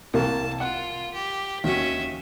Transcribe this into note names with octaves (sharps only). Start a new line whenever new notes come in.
C2 C3 A#3 A5
F4 F#5
G4
D#2 C#4 F#4 E5